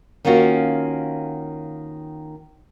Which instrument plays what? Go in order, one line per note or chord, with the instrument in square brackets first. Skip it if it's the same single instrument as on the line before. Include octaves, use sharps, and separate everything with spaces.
[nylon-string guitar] D#3 A#3 C#4 F4 F#4